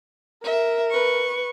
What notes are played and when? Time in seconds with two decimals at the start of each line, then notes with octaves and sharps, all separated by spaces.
0.44 A#4 E5
0.90 B4 C#6